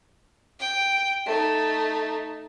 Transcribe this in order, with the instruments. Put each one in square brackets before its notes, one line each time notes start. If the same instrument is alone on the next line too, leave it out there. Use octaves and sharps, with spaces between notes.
[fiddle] G5
A3 D#4